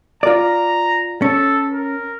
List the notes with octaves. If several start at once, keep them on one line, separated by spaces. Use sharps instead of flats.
F4 D5 A#5
C#4 A4
A#4